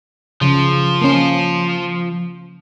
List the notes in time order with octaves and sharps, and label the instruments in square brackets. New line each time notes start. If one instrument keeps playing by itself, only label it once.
[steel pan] C#3 [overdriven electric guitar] F3
[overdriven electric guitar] F3 C5 [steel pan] A#3 C#4